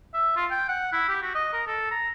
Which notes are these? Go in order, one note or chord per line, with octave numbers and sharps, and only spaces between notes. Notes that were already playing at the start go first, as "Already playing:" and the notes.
E5
F4
G5
F#5
E4
G4
F#4
D#5
A#4
A4
A#5